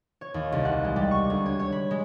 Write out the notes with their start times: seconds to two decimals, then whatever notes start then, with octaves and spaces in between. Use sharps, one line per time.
0.21 C#5
0.34 D#2
0.52 C2
0.65 F#5
0.84 G#3
0.96 G3
1.11 C#6
1.30 D2
1.46 C#5
1.59 C#5
1.72 B5
1.91 G#3